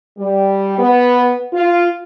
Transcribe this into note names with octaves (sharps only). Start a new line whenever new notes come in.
G3
B3
F4